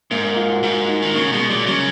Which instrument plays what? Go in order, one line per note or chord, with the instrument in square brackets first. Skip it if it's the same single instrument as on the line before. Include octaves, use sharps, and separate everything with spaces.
[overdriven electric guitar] G#2 [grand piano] A#3
[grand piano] A#3
F4
F#4
[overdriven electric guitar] G#2 [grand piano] F4
[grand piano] D#4
[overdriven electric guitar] D#3
[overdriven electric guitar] C#3 [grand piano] A#3
[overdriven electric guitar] B2 [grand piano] G#3
[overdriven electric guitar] A#2 [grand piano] F#3
[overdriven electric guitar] C#3 [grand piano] F#3